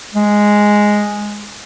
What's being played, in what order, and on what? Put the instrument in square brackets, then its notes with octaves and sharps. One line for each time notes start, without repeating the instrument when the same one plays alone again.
[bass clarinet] G#3